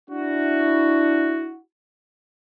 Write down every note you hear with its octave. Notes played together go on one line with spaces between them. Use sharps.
D4 E4 F#4